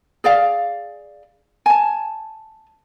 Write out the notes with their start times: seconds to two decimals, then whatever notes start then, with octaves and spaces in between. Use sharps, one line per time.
0.24 G#4 D5 F5
1.66 G#5 A5